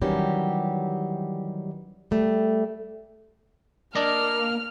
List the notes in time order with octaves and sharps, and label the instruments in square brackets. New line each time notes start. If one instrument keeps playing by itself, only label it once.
[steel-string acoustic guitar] D#3 E3 F#3 G3 C#4 G4
G3 A3
[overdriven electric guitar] A#3 [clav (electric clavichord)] D4 D5 D#5 [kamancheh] F6